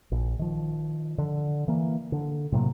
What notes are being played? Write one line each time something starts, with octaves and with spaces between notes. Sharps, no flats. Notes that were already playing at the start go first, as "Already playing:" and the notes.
A#1
D#3 F3
D3
E3 A#3
D3
A2 C3 F#3 A#3